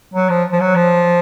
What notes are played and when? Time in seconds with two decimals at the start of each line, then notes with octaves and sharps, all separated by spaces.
0.14 F#3
0.30 F3
0.52 F3
0.60 F#3
0.76 F3